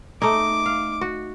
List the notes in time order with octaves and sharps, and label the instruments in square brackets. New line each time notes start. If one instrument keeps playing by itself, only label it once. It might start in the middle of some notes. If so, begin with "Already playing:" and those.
[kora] A3 D#4 [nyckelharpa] D6
[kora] F5
F#4